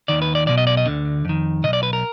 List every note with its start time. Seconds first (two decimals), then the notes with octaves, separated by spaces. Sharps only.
0.08 D#2 D#3 D5
0.22 B4
0.35 D5
0.47 B1 B2 D5
0.58 D#5
0.67 D5
0.77 D#5
0.86 D2 D3
1.25 F2 D#3
1.64 B2 D#5
1.67 B1
1.73 D5
1.83 B4
1.93 A#4